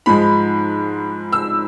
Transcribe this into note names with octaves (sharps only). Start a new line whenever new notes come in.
G#2 F3 G#3 B5
E6